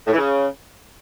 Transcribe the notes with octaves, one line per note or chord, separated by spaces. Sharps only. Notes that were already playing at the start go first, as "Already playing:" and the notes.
A2
E3
C#3